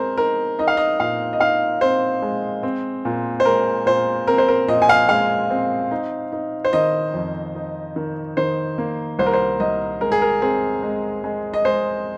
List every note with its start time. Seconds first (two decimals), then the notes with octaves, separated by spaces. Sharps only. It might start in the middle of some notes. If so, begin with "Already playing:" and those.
Already playing: G#3 C4 A#4 C5
0.17 D#4 A#4
0.59 D#4 D#5
0.68 F5
0.77 D#5
1.00 A#2 F5
1.33 D#5
1.40 D#4 F5
1.81 C4 C5
2.22 G#3
2.63 C4
3.05 A#2
3.40 C5
3.45 G#3 A#4
3.86 A#2 C5
4.27 C4 A#4
4.38 C5
4.48 A#4
4.68 A#2 D#5
4.82 G#5
4.89 F5
5.09 G#3 F5
5.50 C4
5.91 D#4
6.32 D#4
6.65 C5
6.73 D#3 D#5
7.14 F2
7.55 D#4
7.96 D#3
8.37 D#3 C5
8.78 A#3
9.19 C2 C5
9.26 A#4
9.33 C5
9.60 C2 D#5
10.01 G#3 A#4
10.12 G#4
10.22 A#4
10.42 C4 G#4
10.83 G#3
11.24 G#3
11.54 D#5
11.65 G#3 C5